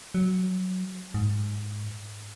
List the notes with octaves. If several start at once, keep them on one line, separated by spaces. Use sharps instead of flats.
F#3
G#2